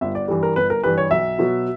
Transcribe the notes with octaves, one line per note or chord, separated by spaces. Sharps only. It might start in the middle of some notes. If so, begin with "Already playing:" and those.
G1 E5
D5
G2 E3 G3
A#4
G1 B4
A#4
G2 E3 G3 B4
C#5
B1 E5
B2 F#3 B3